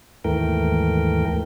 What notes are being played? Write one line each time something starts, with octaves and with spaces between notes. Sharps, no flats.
D#2 G#2 E3 A3 A#4 G5